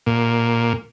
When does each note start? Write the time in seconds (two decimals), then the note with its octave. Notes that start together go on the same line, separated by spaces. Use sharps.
0.07 A#2